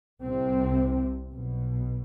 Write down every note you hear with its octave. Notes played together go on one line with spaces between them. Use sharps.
C2 C3 C4
B1 B2